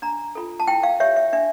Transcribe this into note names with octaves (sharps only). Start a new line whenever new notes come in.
D4 A#5
F4 A4
A5
E4 G5
F5
G4 C#5 E5
E5
D4 E5